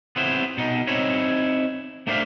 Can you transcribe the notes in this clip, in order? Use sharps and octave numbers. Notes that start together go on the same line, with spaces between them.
B3 C4 E4 C5
B2 D#4
C4 D#4 E4 C#5
A3 A#3 D4 C5 E5 F5